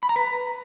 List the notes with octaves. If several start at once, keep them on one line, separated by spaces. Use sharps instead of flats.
B5
A#5
B4